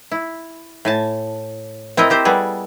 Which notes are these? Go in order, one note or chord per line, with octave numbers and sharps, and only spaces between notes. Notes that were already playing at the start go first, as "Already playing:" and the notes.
E4
A2 G#5 A5
C4 E4 A#4 D#5 A#5
C4 G4 C5
G3 B3 G#4 A4